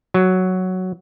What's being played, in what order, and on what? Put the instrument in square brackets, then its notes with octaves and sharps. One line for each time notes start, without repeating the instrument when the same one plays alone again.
[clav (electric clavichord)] F#3